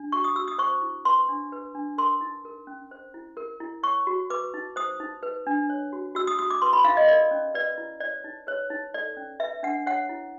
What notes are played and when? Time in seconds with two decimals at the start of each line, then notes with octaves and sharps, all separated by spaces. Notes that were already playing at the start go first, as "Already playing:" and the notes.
Already playing: D4
0.12 F#4 C#6
0.24 D#6
0.35 F#4 E6
0.48 D#6
0.58 C5 C#6
0.82 E4
1.05 B4 C6
1.29 D4
1.52 B4
1.75 D4
1.98 A#4 C6
2.21 D#4
2.45 A#4
2.67 C#4
2.91 C5
3.14 E4
3.37 A#4
3.60 E4
3.83 C#5 C#6
4.07 F#4
4.30 B4 D6
4.54 D#4
4.76 C5 D#6
5.00 D#4
5.23 B4
5.47 D4
5.70 C#5
5.92 F#4
6.15 F#4 E6
6.27 D#6
6.39 F#4 D#6
6.50 D6
6.62 B4 C6
6.73 B5
6.85 D#4 F5
6.97 D#5
7.08 A#4 D5
7.31 C#4
7.54 B4 D5
7.78 E4
8.00 C#5 D5
8.24 D#4
8.47 B4 C#5
8.70 D#4
8.94 A4 D5
9.17 C#4
9.40 B4 E5
9.63 D4 F#5
9.86 C#5 F#5
10.09 E4